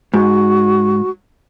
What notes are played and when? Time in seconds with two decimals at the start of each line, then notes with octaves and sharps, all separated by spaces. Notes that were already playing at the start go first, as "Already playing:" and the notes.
0.14 G#2 F#4